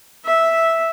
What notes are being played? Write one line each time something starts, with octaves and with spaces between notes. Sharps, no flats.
E5